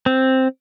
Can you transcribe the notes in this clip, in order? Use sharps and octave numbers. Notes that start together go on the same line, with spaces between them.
C4